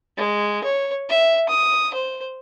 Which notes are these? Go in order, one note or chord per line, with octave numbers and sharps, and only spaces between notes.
G#3
C#5
E5
D#6
C5